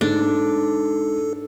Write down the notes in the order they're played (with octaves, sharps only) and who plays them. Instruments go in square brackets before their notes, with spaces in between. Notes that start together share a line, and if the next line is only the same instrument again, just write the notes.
[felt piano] G#2 [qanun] D4 [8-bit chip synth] A4